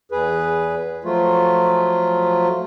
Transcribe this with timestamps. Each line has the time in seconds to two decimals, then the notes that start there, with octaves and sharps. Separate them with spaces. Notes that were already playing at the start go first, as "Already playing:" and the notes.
0.11 E2 G#4 B4
1.04 F3 F#3 A3 F4